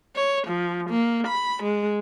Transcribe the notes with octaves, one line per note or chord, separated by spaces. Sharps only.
C#5
F3
A#3
B5
G#3